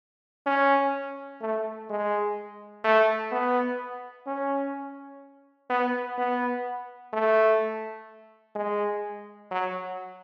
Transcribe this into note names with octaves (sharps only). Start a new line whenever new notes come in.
C#4
A3
G#3
A3
B3
C#4
B3
B3
A3
G#3
F#3